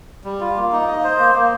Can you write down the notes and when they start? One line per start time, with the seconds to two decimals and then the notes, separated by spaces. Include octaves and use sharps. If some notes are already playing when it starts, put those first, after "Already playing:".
0.24 G3
0.40 F4
0.56 A#3
0.72 D#4
0.88 D#5
1.04 C5
1.19 A#3
1.35 A#3